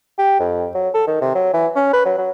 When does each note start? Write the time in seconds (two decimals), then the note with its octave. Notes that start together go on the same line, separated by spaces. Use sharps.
0.18 G4
0.40 F2
0.75 F#3
0.94 A4
1.07 D#3
1.22 C3
1.35 F#3
1.54 E3
1.76 C#4
1.93 B4
2.05 F#3
2.18 F#3